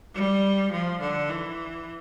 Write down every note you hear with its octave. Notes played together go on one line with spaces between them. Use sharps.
G3
F3
D3
E3